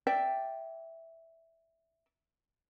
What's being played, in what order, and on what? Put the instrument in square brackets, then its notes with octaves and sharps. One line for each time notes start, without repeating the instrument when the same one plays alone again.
[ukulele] D5 E5 G5